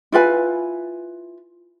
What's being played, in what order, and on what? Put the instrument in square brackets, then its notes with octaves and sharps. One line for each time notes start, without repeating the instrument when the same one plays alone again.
[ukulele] E4 F4 B4 G#5